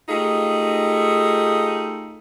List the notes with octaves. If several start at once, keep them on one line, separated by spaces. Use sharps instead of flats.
A3 D#4 F4 G4 G#4